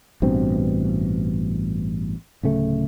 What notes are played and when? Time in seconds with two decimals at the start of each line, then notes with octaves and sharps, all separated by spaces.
0.22 A1 G2 B2 C4
2.43 D1 C#3 A3